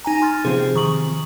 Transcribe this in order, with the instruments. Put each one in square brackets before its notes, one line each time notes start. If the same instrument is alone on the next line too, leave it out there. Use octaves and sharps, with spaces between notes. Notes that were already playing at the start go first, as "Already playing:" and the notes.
[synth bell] D#4 G#5 A#5
C6 F6 A6
[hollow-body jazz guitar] C3 F3 C4 [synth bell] G#4
[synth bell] D#3 C#6 F#7